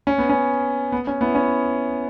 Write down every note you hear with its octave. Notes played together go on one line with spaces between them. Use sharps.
C#4
B3
C#4
B3
C#4
B3 E4
C#4